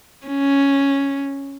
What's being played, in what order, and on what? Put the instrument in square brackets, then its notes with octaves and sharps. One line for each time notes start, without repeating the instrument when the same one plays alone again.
[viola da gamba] C#4